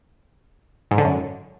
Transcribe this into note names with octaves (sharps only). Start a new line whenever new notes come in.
G#2
D3
F#2